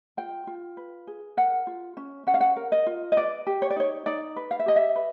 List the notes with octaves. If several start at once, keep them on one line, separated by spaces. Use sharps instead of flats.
F4 G5
F4
B4
G#4
A#4 F#5
F4
C#4
C#4 F#5
F5
F#5
A#4
D#5
F4
D#5
B4 D5
G4
C#5
D5
D#4 C#5
D#4 D5
B4
F5
E5
G4 D#5
E5
B4